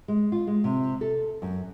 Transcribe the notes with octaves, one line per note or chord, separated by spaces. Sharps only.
G#3
F4
G#3
C3
A4
F#2